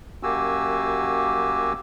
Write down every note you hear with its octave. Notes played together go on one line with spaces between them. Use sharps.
F#2 A#3 F#4 G4 G#5 E6